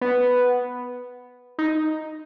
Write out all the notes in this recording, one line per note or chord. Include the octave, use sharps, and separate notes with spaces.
B3
D#4